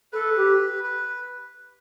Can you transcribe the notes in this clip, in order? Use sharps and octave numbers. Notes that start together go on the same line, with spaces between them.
A4 B4
G4
B4